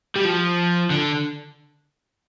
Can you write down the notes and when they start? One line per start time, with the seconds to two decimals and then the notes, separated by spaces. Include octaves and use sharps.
0.16 G3
0.25 F3
0.90 D3